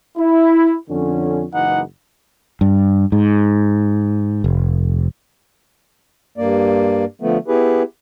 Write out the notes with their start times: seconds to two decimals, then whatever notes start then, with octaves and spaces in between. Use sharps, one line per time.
0.18 E4
0.89 F2 D3 C#4
1.53 F#1 C#2 E3 D#4 F#5
2.61 G2
3.12 G#2
4.44 F1
6.38 G2 A#3 D5
7.22 D3 F3 A3 B3
7.48 B3 E4 G4 G#4 B4